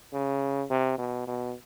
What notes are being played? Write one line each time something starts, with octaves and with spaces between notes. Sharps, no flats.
C#3
C3
B2
B2